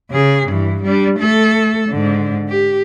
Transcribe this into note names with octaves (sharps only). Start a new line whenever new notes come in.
C#3 G#4
G2 E3
G3 D4
A3 A4
G#2 D3
G4